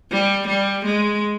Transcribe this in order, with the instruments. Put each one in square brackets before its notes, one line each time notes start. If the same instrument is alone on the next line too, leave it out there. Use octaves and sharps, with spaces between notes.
[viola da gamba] G3
G3
G#3